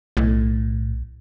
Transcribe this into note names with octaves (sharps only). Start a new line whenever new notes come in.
B1 A2